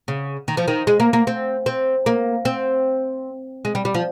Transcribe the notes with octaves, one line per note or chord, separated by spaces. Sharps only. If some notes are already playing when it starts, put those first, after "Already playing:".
C#3
D#3
F3
D#3
G#3
A#3
A#3
C4
C4
A#3
C4
G#3
G3
G3
F3